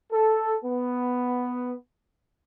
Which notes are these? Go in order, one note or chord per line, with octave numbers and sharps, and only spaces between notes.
A4
B3